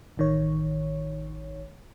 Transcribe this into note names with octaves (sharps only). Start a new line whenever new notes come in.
A1 D#3 C#5